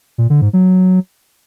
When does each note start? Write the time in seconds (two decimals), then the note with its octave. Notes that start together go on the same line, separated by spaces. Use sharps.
0.18 A#2
0.30 D3
0.42 G#2
0.53 F#3